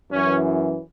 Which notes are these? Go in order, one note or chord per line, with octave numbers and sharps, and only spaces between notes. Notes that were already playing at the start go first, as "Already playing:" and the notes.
F#2 E3 C#4